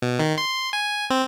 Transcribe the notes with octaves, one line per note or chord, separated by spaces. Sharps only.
B2
D#3
C6
G#5
C4